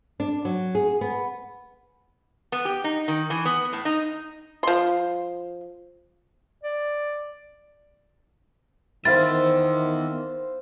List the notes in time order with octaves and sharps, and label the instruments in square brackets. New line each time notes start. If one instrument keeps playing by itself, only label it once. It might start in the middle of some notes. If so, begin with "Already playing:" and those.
[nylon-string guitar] D4
F#3
G#4
B3
[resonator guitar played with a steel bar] B3
G4
D#4
D#3
E3
B3
A2
D#4
[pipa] F3 C6
[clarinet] D5
[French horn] D#3 [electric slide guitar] B3 E4 E5 [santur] C5 F5 C6 [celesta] A6